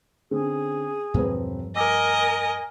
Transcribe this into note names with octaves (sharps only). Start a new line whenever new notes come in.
D3 C4 C#4 G#4
E1 G2 F3 A#3 C4 B4
A#4 D#5 G#5 D6 E6 A#6